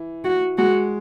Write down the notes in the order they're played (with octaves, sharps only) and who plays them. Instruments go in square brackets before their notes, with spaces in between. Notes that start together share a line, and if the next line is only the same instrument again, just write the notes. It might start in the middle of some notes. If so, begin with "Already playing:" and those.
Already playing: [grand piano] E3
[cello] F#4
[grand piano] G#3 [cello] F#4